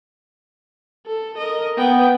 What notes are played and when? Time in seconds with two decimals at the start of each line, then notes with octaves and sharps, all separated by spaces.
1.07 A4
1.38 A#4 D#5
1.77 B3 G5